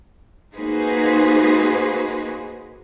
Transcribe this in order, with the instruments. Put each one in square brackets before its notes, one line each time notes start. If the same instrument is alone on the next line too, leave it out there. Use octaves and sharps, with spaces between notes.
[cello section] A#3 D#4 F#4 G#4 B4 C5